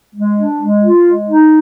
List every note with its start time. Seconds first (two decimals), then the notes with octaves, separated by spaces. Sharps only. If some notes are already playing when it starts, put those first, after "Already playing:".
0.15 G#3
0.37 D4
0.60 G#3
0.82 F4
1.05 G#3
1.29 D#4